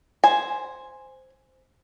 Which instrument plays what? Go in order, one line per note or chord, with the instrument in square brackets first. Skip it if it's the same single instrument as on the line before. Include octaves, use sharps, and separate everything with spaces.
[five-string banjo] C5 G#5